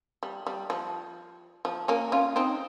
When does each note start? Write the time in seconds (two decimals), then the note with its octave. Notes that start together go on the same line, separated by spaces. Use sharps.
0.23 G3
0.47 G3
0.70 F3
1.65 F3
1.88 A#3 C#4
2.12 C#4 F4
2.36 C4 D#4